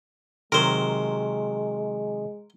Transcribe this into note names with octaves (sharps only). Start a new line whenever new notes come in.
C3 D#3 F#3 G#3 A#4 C5